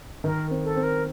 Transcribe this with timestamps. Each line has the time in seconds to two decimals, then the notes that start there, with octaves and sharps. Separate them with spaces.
0.24 D#3 A#4
0.51 C4
0.64 A4
0.76 C4
0.83 A#4